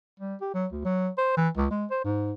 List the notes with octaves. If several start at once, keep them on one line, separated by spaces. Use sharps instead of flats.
G3
G4
F#3
D2
F#3
C5
E3
C#2
G#3
C5
G#2